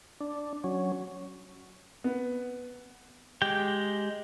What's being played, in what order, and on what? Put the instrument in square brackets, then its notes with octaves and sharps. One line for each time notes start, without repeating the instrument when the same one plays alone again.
[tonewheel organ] D4
F#3 C#4
[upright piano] B3
[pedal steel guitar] G#3 G4 G5